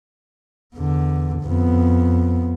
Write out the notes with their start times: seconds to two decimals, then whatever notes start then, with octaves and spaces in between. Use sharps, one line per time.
0.75 E2 D3
1.43 F2 B3